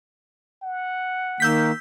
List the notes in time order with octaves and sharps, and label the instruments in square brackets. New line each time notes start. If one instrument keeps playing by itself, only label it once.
[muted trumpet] F#5
[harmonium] D#3 A#3 [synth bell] E6 G6 B6